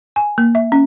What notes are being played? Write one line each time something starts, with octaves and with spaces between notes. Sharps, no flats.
G#5
A#3
E5
C#4